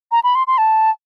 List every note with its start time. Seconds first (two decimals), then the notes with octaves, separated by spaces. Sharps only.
0.12 A#5
0.24 B5
0.35 C6
0.47 C6
0.58 A5